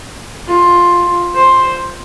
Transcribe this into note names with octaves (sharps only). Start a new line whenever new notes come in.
F4
C5